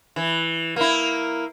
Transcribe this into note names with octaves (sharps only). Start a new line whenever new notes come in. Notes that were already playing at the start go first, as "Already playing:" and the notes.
E3
A#3 E4